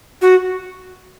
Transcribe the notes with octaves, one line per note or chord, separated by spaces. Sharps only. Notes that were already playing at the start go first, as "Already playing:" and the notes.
F#4